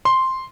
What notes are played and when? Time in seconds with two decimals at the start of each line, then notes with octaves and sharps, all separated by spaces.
0.05 C6